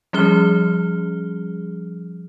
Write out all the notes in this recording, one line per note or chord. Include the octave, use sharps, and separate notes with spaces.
F3 G3 C#4 G#4 F6 G7